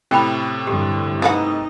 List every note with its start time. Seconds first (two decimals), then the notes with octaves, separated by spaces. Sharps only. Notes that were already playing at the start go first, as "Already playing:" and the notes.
0.11 A2 C3 C#4 G5 B5
0.67 G2 D3 G4
1.22 C#3 D#4 B4 F#5